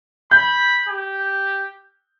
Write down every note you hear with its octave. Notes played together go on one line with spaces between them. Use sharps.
B5 G6
G4